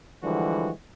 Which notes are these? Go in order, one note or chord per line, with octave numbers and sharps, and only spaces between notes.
D3 E3 F3 G3 G#3 F#4